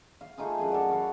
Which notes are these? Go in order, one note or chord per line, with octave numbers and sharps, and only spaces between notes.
F5
A3 D#4 F4 G#4
F#2 F#4 G#4 G#5
A4 D5
F#4 F5 B5